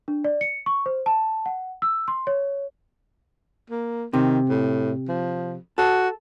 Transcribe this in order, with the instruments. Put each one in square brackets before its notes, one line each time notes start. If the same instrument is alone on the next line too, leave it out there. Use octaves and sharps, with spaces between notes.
[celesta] D4
D5
C#7
C#6
C5
A5
F#5
E6
C6
C#5
[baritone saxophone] A#3
[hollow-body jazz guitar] C3 [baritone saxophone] D#3
[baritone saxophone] A2
F3
[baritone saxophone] F#4 [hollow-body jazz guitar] A4